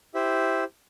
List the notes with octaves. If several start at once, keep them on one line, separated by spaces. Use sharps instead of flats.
E4 G4 C5 E5